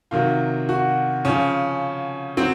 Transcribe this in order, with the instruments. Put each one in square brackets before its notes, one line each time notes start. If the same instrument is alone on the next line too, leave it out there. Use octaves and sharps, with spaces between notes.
[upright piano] C3 D#3 F#3 F4
F#4
C#3 F3 C#4
F#3 C4